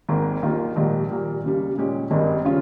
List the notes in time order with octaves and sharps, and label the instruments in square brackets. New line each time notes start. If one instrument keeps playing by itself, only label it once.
[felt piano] G#1 G#2 D#3 A#3
D#2 D#3 A#3 F4
A#1 G#2 D#3 G3
A#2 G3 A#3
D#2 C#3 G3
A#2 G#3 C#4 G4
G#1 G2 D#3 G#3 D#4
C#3 G3 C#4 F4